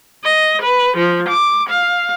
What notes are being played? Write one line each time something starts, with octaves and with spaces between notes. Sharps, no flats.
D#5
B4
F3
D6
F5